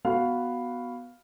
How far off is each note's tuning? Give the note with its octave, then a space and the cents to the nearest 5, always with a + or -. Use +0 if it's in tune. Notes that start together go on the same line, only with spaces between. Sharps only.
B3 +0 F#4 +0 F5 +0